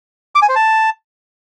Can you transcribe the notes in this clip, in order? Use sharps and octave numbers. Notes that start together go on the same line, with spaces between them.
D6
G#5
C5
A5